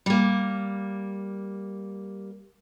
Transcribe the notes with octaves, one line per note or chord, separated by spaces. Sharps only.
G3 A#3